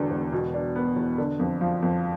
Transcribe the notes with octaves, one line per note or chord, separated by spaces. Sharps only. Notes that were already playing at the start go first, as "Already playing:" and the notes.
Already playing: E1 E2 D3
E1
B2
D4
B3
E2
D3
F2
F3
F2